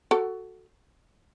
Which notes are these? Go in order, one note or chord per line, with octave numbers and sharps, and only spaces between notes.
F#4 A4